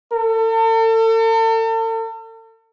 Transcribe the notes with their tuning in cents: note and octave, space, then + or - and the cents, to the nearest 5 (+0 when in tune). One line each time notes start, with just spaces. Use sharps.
A4 +40